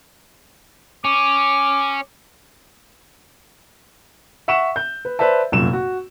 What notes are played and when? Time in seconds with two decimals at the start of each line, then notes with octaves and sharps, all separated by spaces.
1.05 C#4 D6
4.48 E5 F#5 C#6 E7
4.76 G6
5.05 B4
5.19 B4 C5 D5 E5 A5
5.52 F1 F#2 A#2 E7
5.73 F#4